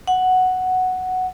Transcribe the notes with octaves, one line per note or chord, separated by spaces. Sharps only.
F#5